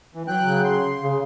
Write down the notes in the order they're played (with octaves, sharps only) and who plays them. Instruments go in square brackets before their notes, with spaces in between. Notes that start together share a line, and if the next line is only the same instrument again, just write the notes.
[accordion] E3
F#3 G5 F#6
[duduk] C#3
[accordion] C6
[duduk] C#3